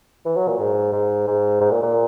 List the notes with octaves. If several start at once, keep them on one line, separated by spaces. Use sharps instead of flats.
E3
F#3
A#2
G#2
G#2
G#2
G#2
A#2
A#2